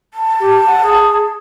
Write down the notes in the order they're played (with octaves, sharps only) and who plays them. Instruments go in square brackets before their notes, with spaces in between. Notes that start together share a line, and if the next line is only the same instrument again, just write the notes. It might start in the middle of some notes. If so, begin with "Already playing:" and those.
[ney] A5
[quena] G4
F#5
G#4